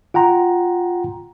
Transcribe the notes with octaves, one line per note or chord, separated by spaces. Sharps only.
F4 F#5 G5 A#5 C6